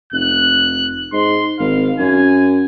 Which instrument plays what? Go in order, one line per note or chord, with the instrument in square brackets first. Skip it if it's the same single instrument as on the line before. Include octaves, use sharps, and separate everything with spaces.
[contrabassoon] F1 [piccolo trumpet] F#6
[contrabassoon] G#2 [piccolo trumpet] C6
[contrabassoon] G#1 [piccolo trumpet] F5
[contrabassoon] F#2 [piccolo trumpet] G#5